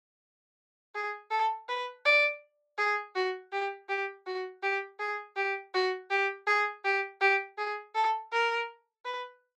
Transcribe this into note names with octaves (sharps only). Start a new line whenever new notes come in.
G#4
A4
B4
D5
G#4
F#4
G4
G4
F#4
G4
G#4
G4
F#4
G4
G#4
G4
G4
G#4
A4
A#4
B4